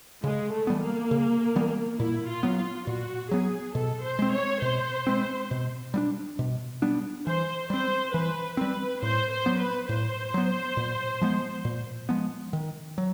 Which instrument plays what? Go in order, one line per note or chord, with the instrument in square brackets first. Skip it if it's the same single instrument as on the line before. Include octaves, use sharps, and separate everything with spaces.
[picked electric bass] C#3 [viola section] G#3
[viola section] A3
[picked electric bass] E3 G3 B3
[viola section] A#3
[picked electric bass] C#3
E3 G3 B3
[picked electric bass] A#2 [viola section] E4
[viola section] F4
[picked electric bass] F#3 B3
[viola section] F4
[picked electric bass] A#2 [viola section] F#4
[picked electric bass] F#3 B3 [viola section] G#4
[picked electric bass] B2 [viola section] A4
[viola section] C5
[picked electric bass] G#3 C4
[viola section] C#5
[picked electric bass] B2 [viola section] C5
[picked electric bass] G#3 C4
B2
G3 B3 D4
B2
G3 B3 D4
[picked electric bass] E3 [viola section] C5
[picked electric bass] G3 C4 [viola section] C5
[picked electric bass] E3 [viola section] B4
[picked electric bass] G3 C4 [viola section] B4
[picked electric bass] A2 [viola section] C5
[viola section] C5
[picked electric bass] F#3 B3
[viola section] B4
[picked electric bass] A2 [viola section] C5
[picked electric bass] F#3 B3
A#2
F3 G#3 B3
A#2
F3 G#3 B3
D#3
F#3